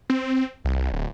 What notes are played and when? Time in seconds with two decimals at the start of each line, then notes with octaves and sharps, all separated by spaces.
0.10 C4
0.65 C2
0.92 D1